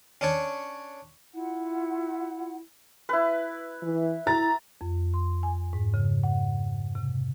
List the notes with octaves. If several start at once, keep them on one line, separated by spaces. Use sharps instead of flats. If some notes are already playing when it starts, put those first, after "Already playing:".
C#4 D4 C#5
E4 F4 F#5
E4 B4
E3
E4 A#5 A6
F2
C6
G#5
G#2
C#3
F#5
C3